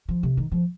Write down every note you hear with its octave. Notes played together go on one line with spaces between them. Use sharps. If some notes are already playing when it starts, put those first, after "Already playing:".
F3
C3
D#3
F3